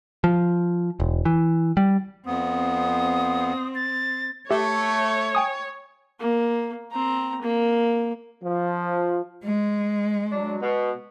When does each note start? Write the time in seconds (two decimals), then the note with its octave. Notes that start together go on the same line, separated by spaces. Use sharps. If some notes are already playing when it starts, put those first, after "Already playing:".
0.24 F3
1.00 E1
1.25 E3
1.77 G3
2.26 F2 B3 C4 D#6
3.75 A6
4.51 A3 G4 C#5 E5
5.35 G5 G#5 D#6
6.20 A#3
6.92 C4 A#5
7.42 A#3
8.42 F3
9.44 G#3
10.32 F#3 D4
10.62 B2